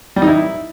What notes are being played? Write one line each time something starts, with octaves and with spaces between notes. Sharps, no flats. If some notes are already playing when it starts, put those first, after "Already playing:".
G3
D#4
E4